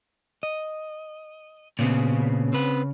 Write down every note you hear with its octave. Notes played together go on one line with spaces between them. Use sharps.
D#5
A#2 C#3 B3 C4
C4 B4